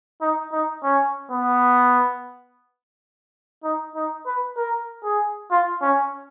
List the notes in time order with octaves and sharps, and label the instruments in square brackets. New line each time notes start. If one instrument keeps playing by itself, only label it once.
[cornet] D#4
D#4
C#4
B3
D#4
D#4
B4
A#4
G#4
F4
C#4